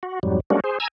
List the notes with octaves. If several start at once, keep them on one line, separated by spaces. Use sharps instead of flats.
F#4
F2 G#2 F#3 G3
G3 G#3 A#3 C#4 D4 F#4
G#4 C5
G#5 A#5 E6 G#6